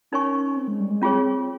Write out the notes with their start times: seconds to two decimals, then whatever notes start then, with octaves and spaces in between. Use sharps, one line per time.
0.12 C#4 D#4 A#4 C#5 G#5 C#6
0.57 C4
0.68 G#3
0.80 G3
0.90 G#3
1.02 C4 C#4 F4 G#4 C#5